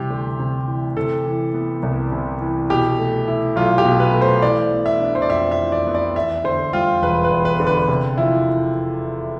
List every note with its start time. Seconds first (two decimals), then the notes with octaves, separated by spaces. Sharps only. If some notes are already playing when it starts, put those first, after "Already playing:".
Already playing: C3 E3 G3 G4
0.10 D2
0.40 C3
0.67 E3
0.96 C3 A4
1.25 E3
1.54 B3
1.83 C2
2.12 C3
2.41 E3
2.70 B2 G4
2.99 A3
3.28 E4
3.56 B1 F4
3.78 G4
3.85 B2
4.00 B4
4.13 A3
4.21 C5
4.42 E3 D5
4.71 B3
4.86 E5
5.00 D4
5.15 C5
5.22 D5
5.29 F2 E5
5.51 E5
5.58 E3
5.72 D5
5.87 B3
5.95 D5
6.16 E2 E5
6.44 D3 C5
6.73 G3 F4
7.02 E1 B4
7.24 B4
7.31 E2
7.45 B4
7.60 D3
7.67 B4
7.88 C3
8.18 F3 E4